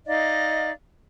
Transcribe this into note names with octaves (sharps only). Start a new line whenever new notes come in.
D#4 D5 D#5 F5